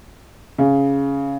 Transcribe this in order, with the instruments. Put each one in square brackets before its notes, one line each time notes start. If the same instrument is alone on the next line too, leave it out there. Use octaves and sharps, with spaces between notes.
[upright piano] C#3